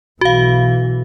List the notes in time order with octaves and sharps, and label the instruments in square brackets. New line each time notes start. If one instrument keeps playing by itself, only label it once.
[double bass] B1 E3 [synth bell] F#4 F5